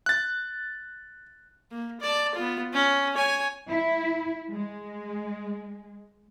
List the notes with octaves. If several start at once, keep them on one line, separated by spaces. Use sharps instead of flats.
F#6 A6
A#3
D5 A5
B3 F4
C#4
C#5 G#5
E4
G#3